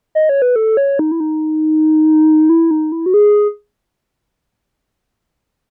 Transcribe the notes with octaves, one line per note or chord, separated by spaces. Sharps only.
D#5
C#5
B4
A4
C#5
D#4
E4
D#4
E4
D#4
E4
F#4
G#4